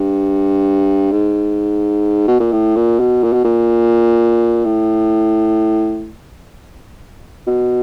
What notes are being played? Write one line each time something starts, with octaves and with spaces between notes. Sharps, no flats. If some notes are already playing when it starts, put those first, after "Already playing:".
Already playing: G2
G#2
B2
A#2
A2
A#2
B2
A#2
B2
A#2
A2
B2